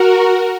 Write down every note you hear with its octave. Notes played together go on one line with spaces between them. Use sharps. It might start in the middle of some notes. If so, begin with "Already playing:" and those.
Already playing: F#4 A#4